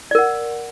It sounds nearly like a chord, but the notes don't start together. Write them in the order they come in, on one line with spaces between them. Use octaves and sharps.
D5 A#4 F#5